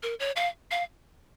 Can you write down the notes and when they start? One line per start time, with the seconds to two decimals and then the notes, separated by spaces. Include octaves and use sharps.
0.03 A#4
0.20 C#5
0.36 F5
0.71 F5